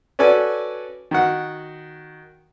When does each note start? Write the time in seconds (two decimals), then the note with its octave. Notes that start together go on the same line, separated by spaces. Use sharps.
0.19 C#4 F#4 A4 B4 D5 G#5
1.11 D#3 F#4 F#5